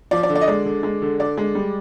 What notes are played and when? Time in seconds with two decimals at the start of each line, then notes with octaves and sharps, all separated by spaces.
0.11 F3 D5
0.23 D5
0.29 D3
0.35 D5
0.41 D#5
0.48 G#3 D5
0.65 D3
0.83 G#3
1.02 D3
1.20 D3 D5
1.38 G#3
1.55 G3